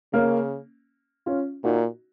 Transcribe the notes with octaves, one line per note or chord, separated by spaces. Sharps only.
C#3 A#3 C#4
C#4 F4
A#2 D#4 F#4